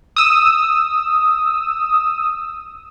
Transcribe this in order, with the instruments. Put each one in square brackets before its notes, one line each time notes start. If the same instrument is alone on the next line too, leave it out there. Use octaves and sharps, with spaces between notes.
[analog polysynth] D#6 E6